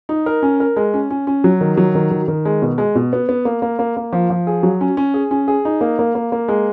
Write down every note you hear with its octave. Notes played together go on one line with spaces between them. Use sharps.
D#4
A#4
C#4
A#4
G#3
C#4
C#4
C#4
F#3
D#3
F#3
D#3
D#3
D#3
G#3
B2
G#3
B2
B3
B3
A#3
A#3
A#3
A#3
F3
F3
G#4
F#3
C#4
C#4
G#4
C#4
G#4
D#4
A#3
A#3
A#3
A#3
G#3